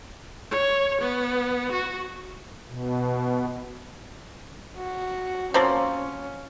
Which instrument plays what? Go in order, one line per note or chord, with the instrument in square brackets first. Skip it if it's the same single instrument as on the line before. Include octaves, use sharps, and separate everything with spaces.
[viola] C#5
B3
F#4
[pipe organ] B2
[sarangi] F#4
[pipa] F3 A#3 C4 [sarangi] C#4